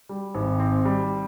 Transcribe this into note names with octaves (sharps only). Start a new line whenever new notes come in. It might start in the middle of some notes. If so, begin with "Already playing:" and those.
G3
G#1
C4
G3